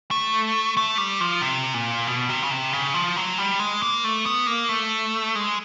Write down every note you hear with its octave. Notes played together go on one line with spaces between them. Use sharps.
A3
A3
G3
F3
C3
A#2
B2
C3
C#3
C3
C#3
F3
F#3
G3
G#3
A#3
A3
B3
A#3
A3
G#3